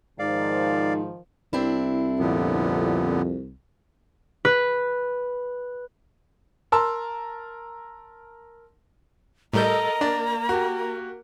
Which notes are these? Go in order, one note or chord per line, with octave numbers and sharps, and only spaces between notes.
G#2 D#3 F3 D#4 D5 F5
C2 C4 D4 E4
F2 A#2 D3 B3
B4
A#4 A5 C6 E6
A2 G3 A4 A#4 D#5 A#5 G6
A#3 D4 D5
F#4 G4